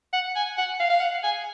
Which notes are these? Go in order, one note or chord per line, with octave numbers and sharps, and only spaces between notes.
F#5
G#5
F#5
F5
F5
F#5
G#5